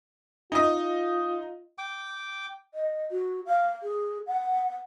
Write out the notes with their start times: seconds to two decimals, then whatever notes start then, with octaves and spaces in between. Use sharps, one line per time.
0.52 D#4 F4 D#5
1.78 G5 D6
2.74 D#5
3.11 F#4
3.46 F5
3.83 G#4
4.27 F#5